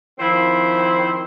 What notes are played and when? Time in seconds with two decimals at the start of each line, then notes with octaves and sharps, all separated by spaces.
0.19 D#3 F3 C4 E4 C5